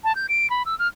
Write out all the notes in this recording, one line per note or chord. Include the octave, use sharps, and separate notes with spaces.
A5
G6
D7
B5
E6
F6